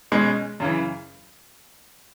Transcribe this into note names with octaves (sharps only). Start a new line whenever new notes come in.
B2 G#3 C#4
F#2 C#3 E3